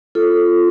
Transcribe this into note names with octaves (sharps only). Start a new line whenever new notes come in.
F4 A4